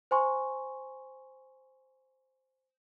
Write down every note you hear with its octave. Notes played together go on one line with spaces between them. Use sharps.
C5 G#5 C6 C#6